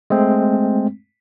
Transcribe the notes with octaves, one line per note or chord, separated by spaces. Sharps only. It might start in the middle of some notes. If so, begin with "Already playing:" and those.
G#3 A3 C4